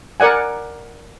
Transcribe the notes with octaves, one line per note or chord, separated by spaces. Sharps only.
A#4 D5 F#5 G#5